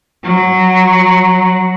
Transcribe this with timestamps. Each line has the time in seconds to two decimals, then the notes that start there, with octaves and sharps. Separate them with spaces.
0.24 F#3